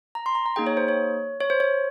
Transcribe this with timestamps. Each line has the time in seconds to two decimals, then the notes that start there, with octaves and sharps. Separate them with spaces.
0.15 A#5
0.26 C6
0.35 A#5
0.46 A#5
0.56 A#3 D#4 G#4 G5
0.67 C#5
0.77 C5
0.88 C#5
1.40 C#5
1.50 C5
1.60 C#5